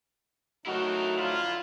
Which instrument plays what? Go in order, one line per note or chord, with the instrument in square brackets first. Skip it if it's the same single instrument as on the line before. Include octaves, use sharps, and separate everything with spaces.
[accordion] F#3 A3 D#4 [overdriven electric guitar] E4 A#4 [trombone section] F#4
[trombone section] F#2 D3 F3 [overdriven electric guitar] E4 [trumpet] F4